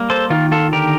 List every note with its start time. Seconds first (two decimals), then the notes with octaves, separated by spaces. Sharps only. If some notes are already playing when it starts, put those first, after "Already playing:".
Already playing: G3 A#3
0.10 A4 C5
0.30 D#3 F4
0.52 F4 A4
0.72 D3 G4 A#4